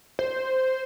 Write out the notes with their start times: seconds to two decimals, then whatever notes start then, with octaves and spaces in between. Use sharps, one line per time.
0.19 C5